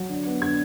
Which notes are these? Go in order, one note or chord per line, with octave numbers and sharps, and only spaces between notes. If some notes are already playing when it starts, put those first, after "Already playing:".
Already playing: F#3
D3
B3
D3 G#6